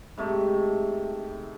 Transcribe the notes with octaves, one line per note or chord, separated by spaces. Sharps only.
G#2 C3 A3